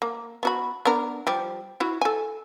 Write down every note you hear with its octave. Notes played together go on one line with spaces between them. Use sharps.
A#3
B3 F#4 B5
B3 D4 A#4
F3 G3 G4
E4 F#4
A4 G#5